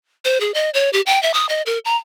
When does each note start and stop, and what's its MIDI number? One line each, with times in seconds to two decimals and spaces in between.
0.25 0.40 72
0.40 0.54 68
0.54 0.70 75
0.74 0.90 73
0.93 1.01 67
1.06 1.21 79
1.23 1.33 76
1.34 1.48 87
1.49 1.62 75
1.66 1.78 70
1.85 1.97 82